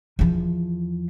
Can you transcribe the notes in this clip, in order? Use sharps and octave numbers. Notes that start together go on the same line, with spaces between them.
E2 F3